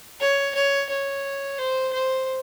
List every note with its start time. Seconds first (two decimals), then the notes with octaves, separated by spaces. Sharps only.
0.20 C#5
0.55 C#5
0.89 C#5
1.58 C5
1.93 C5